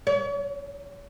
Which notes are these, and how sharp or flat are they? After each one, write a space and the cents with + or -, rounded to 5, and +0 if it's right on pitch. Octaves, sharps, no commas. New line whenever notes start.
C#5 +40